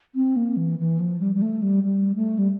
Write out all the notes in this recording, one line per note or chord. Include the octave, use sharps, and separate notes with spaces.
C4
A#3
E3
E3
F3
G3
G3
A3
G3
G3
A3
G3